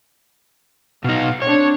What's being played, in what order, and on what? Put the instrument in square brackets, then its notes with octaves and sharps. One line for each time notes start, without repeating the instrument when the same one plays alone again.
[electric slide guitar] B2 D#4 [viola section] F5
[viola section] C4 D4 [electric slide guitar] C#5